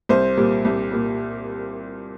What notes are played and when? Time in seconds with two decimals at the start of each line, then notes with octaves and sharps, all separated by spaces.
0.09 C2 C5
0.37 A#2 G3
0.65 C2
0.92 A#2 G3